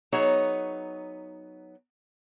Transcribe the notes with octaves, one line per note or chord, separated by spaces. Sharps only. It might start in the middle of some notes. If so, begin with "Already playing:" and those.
F#3 B3 D#4 G#4 C#5